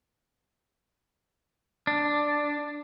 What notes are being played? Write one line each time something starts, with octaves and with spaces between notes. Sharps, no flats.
D4